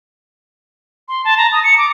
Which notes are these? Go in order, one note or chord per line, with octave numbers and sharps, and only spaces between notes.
C6
A5
A#5
D#6
C#7
D6